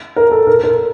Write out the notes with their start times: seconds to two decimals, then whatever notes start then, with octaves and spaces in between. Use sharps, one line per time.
0.16 A#4
0.31 A4
0.47 A#4
0.63 A#4